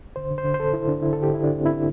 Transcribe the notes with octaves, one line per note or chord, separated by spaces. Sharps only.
D3 C5
D3
C5
D3
C5
D3 A4
D3 E4
D3 D4
D3 E4
D3 A4
G4
D3 E4
D3 D4
C4
E4
D3